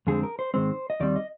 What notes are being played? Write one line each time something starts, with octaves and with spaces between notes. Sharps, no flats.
F2 D3 G#3 C4 G#4
A#4
C5
G#2 D#3 G#3 C4 C5
D#5
D#2 D#3 G3 C4 D5
D#5